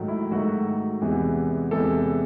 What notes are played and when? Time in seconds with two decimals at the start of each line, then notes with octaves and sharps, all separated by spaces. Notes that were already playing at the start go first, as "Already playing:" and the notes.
Already playing: G#2 D#3 F#3 A3
0.08 E4
0.31 G#2 D#3 F#3 A3 F#4
1.01 E2 C3 E3 G#3
1.71 E2 C3 E3 G#3 A4